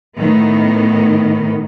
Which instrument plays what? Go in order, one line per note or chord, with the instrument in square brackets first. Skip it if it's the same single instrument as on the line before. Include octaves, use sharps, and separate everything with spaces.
[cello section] A2 D#3 B3